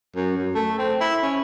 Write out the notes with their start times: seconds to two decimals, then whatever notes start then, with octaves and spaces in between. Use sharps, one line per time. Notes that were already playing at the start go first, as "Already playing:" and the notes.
0.16 F#2
0.37 F#2
0.55 A3
0.79 C4
1.00 E4
1.23 C#4